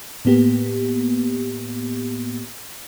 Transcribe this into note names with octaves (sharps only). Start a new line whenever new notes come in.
A2 A#3 B3 G4